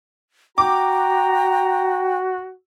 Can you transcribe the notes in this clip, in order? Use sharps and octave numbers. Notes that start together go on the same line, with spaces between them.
F#4 G5 A#5 D6